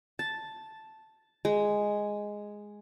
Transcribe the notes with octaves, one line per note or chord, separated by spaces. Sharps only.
A5
G#3